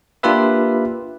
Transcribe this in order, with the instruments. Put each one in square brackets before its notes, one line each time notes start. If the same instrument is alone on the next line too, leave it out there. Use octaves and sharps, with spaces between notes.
[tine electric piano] A#3 D4 F4 G4 B4 E5